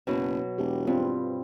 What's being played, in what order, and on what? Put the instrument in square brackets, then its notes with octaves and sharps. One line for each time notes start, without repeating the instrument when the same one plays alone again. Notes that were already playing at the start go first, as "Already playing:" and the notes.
[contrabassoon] F#1 [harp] B2 F#3
[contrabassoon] E1 [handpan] G4
[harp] G2 [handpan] C4 F4